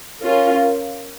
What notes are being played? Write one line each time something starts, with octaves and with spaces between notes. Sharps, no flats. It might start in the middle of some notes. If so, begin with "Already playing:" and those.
C#4 F4 A#4